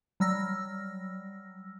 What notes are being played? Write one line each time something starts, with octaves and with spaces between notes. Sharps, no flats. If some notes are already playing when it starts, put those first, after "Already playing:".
F#3 G3 E6 F6 A#6